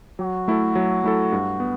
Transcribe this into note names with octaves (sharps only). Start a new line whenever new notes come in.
F#3 F#4
A3 E4 A4
F#3
A3 E4 A4
G2
B3